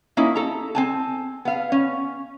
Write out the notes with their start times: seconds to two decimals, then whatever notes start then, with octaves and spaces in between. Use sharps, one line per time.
0.17 A#3 C#4 D#4 E4
0.35 A4 A#5
0.75 C4 G#5 A5
1.45 B3 F5
1.72 C#4